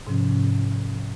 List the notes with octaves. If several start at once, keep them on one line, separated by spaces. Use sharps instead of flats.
G#2 C3 F3 C#4